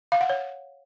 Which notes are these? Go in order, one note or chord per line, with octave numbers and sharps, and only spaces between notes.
F5
F#5
C#5